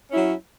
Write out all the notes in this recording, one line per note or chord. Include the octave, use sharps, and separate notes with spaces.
F#3 C#4 E4